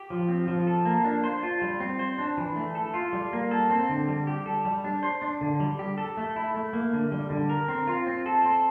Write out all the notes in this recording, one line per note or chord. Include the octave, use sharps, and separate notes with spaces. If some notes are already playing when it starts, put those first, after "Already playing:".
Already playing: G4
F3
C4
F3
A4
A#3
D4
C5
F4
G3
C4
C5
D4
E3
A3
A4
F4
G3
A#3
A4
C4
D3
G3
G4
A4
G3
D4
C5
D4
D3
G3
G4
A4
A3
E4
A3
A#3
D3
G3
D3
A#4
C4
F4
C4
A4
C4